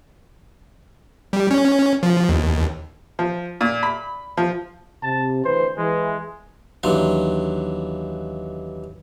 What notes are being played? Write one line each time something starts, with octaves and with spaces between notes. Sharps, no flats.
G3
C#4
F3
D#2
F3
A#2
B5
F3
C3 A5
D2 E3 B4 C5
E3 G#3
D#2 E3 F#3 D4 C6